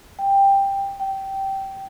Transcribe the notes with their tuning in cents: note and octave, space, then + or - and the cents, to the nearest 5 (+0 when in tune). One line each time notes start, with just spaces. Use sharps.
G5 +10
G5 -15